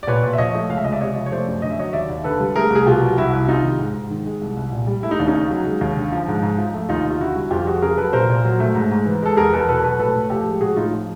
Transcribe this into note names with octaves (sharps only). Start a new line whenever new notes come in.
D5
A#2 B4 C#5
A#2
E5
F3 C#5 D#5
A3
C#2 F5
E5
C#2 D#5
D5 E5
C3 C#5 D#5
F3
C#5
A3 C5 D5
F#2
D3 D#5
E5
F#3 C#5 D#5
D#2 D5 E5
D#2
D3 A4 B4
G3
A3 G#4 A#4
C2
G#4
B2 F4 G4
F#3
C2 E4 F#4
C2
C3 D#4 F4
D#3
G#2
G#2
D#3
G#3
C2
C2
A#2
G3
A3 E4
D#4
D#2 D4
C#4 D#4
C#3
F#3
G#3
D#2
D3
F3
G#2
G#2
F3
A3
D#2 D#4 F4
D#2
F4
D3 E4 F#4
G3
F2 F4 G4
F2 F#4 G#4
C#3 G#4 A#4
F#3 A4 B4
A#2 A#4 C5
A#2
F#3
A3
G#2
G#2
E3
G#3 A4
E2 G#4 A#4
E2 A4 B4
A#4
B2 A4 B4
F#3 A4 B4
A2 A4 B4
A2
F3 G4 A4
G#3
A2 F#4 G#4
A2 D#4 F4
F3